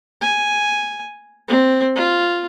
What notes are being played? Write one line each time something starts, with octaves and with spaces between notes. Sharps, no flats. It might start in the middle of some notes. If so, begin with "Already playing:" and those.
G#5
C4
F4